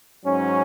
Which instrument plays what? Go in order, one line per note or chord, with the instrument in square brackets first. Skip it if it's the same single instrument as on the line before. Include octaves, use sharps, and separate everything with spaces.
[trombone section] G#2 F#3 C#4